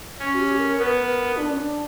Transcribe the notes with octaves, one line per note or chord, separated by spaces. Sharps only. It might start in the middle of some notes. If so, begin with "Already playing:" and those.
C#4
F#4
G4
A#4
B3 A#4
B4
A#4
D4
C#4
D4